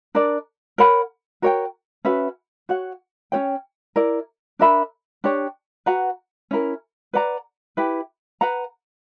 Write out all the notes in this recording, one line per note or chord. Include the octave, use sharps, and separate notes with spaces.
D4 A#4 D5
A#4 C#5 F#5 B5
F#4 A#4 C#5 G5
C#4 F#4 B4 E5
F#4 C#5 F#5
C#4 F#4 C#5 G5
E4 A#4 D5
D4 A#4 E5 B5
D4 G4 C#5
F#4 B4 F#5 A#5
C#4 E4 A#4
B4 D5 F#5 A#5
E4 G4 B4
B4 F#5 A#5